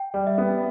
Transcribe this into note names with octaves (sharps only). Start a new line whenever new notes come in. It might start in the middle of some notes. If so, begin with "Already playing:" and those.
Already playing: G5
G3
E5
B3